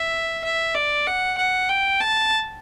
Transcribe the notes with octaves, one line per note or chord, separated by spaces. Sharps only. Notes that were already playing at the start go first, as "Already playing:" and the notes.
Already playing: E5
E5
D5
F#5
F#5
G5
A5